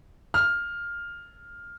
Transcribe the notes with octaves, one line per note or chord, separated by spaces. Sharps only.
F6